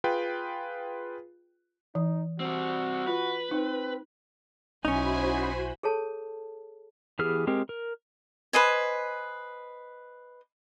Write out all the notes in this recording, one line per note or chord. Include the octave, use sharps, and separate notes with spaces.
F4 G#4 B4 G5
E3 D#4
G3 C4 F#4
F4 B4
C4 D#4
B1 C#4 D#4 E4 F#4 C5 G#5 B5
G#4 A4 C#5 A5
E3 B3 G4 G#4 F6
G#3 C4 G4 A#4
A#4
B4 C5 D#5 G#5